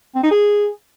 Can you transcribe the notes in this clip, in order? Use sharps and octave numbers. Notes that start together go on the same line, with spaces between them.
C4
D#4
G#4